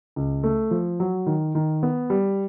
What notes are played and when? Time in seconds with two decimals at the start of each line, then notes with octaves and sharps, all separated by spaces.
0.16 C#2
0.44 A3
0.71 F3
1.00 F#3
1.27 D#3
1.55 D#3
1.83 B3
2.10 G3